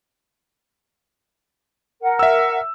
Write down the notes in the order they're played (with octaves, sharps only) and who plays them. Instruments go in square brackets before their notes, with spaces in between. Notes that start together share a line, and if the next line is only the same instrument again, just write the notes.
[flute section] A#4 F#5
[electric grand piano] E5 E6